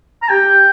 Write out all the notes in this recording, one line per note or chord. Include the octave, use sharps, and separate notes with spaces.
A#5
G4 G5